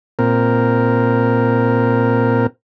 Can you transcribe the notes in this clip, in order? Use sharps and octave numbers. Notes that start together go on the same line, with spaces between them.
A#2 C4 A#4